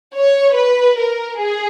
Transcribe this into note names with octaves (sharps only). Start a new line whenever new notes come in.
C#5
B4
A#4
G#4